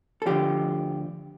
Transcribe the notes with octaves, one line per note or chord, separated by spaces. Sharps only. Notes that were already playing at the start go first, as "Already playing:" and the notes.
A4
D2 D3 F3 G4